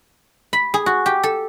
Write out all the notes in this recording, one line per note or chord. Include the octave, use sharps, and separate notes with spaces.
B5
G#4
F#4
G4
A4